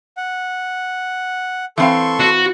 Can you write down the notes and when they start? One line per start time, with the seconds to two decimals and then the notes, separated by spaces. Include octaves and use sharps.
0.17 F#5
1.78 E3 C4 A4 F5 C6 C#6
2.20 F#4